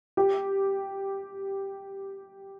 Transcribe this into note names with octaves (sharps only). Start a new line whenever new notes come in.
G4